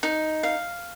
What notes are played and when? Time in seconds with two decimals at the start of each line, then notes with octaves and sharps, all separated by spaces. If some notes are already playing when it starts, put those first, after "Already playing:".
0.03 D#4
0.43 F5